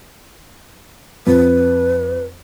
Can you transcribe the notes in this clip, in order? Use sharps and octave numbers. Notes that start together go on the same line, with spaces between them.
F2 B4